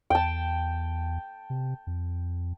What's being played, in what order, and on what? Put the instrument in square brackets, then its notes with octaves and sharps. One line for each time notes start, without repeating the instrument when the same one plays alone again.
[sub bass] E2 [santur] G5 A5
[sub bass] C3
F2